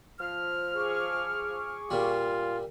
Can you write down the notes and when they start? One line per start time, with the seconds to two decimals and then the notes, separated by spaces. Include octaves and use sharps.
0.19 F3 F6
0.74 G#4 C#6 D6
1.91 A#2 G3 F4